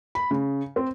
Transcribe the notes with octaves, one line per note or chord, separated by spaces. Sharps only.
B5
C#3
C4